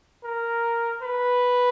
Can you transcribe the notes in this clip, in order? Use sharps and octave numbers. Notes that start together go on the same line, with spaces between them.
A#4
B4